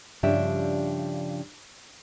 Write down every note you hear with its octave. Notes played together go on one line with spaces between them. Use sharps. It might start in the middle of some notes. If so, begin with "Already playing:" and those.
G2 C#3 F3 G3 D4 E5